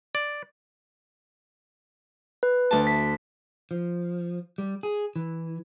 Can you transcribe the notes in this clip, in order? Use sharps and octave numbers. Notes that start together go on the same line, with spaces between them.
D5
B4
D2 A5
B6
F3
G3
G#4
E3